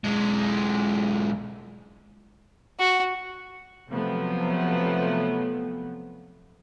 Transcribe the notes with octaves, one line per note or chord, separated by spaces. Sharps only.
B1 G#3
F#4
C3 F3 F#3 A3 B3